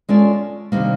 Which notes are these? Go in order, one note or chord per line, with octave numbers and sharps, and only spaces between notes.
G#3 C#4 F4 A4 D5
C3 D#3 G3 A#3 D4